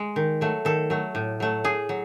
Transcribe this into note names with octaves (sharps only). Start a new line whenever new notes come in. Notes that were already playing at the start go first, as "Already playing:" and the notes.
Already playing: G#3
D#3
F#3 A3
D#3 A4
F#3 A3
A2
F#3 A3
A2 G#4
F#3